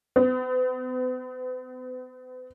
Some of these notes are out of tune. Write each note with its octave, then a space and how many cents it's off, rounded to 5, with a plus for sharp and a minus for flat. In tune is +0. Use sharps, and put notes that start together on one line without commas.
B3 +40